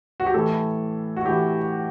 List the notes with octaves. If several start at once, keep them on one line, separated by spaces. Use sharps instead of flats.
F#4
G4
A2 E3 A4
F#4
A2 E3 G4